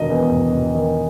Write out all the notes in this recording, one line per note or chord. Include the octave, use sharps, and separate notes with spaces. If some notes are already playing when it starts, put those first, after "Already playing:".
Already playing: E1 D#3 D#5
E2
E1
E1
D#3